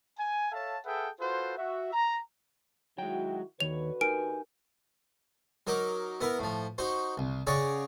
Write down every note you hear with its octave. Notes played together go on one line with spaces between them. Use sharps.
G#5
A4 C#5 E5 F5 A5
G#4 A4 B4 E5 F#5 G5
F4 F#4 A4 B4 C5
F#4 E5
A#5
D#3 F#3 G#3 E4 F#4 G5
D#2 D3 D#3 F#4 B4 C#5 F7
D#4 G4 A#4 G#5 D7
F#3 D#4 A#4 D6
B3 E4 A#4
A2 F3
D#4 F#4 C5
C2
C#3 G#4 C#5 D5 F#5 A#5